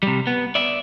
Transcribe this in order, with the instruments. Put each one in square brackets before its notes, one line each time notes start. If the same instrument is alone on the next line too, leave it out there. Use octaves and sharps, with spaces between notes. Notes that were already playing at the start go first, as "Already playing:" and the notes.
[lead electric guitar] C3 G3
B3
D5 E5